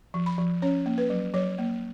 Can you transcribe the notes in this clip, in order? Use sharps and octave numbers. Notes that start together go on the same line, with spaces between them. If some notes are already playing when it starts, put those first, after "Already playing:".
F3
B5
F3
C#4 C#5
A#3
B4
F#3
F#3 C#5
A#3